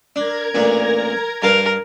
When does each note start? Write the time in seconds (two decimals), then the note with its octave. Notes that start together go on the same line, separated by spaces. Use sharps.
0.16 D4 A#4 A#5 G#6
0.55 A1 A#2 D4
1.43 G2 A#4 F5 A5